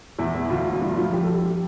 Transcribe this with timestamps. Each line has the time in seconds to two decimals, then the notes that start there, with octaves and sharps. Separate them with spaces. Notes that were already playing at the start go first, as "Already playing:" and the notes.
0.18 E2 E4
0.34 E2
0.50 D2 F4
0.66 E1
0.76 F4
0.81 G2 E4
0.97 F3 F4
1.13 G3 G4
1.24 A4
1.29 G3
1.34 G4
1.45 G4